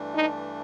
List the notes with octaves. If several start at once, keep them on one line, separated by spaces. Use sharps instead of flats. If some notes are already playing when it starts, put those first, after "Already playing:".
Already playing: G2 E3 A3 D4
D#4